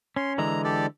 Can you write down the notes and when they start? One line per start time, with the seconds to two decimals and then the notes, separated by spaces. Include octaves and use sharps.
0.16 C#4 C6
0.38 D3 E3 G#3 A#5
0.64 G4 A4 D5